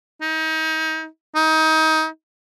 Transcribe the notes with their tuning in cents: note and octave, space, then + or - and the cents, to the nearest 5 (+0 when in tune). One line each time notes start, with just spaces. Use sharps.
D#4 +30
D#4 +25